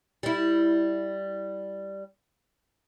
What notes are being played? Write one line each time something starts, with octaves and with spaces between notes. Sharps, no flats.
G3 E4